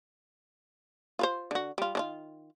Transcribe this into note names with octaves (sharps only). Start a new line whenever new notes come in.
F4 B4 C5
D3 F#4
G3 F4
D#3 D4 F4